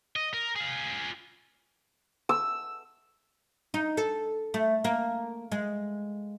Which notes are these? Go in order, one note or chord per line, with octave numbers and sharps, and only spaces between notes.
D#5
A#4
F4 G#4
E6
D#4
A4
A3
A#3
G#3